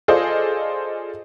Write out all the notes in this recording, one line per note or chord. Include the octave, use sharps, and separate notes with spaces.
F4 G#4 A4 C5 D5 D#5